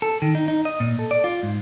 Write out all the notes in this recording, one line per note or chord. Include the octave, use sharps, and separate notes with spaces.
A4
D#3
D#4
D#4
D#5
A#2
A4
D5
F4
G#2